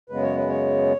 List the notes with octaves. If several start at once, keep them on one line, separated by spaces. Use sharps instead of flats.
F#2 C#3 G#3 B3 B4
C#5
B4
C#5